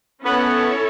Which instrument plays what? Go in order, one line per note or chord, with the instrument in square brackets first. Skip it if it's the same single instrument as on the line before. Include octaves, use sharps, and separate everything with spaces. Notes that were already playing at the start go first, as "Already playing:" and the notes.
[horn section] B3 [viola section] C#4 E4 A4 C#5